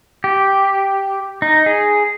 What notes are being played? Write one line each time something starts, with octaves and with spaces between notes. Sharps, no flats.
G4
D#4
G#4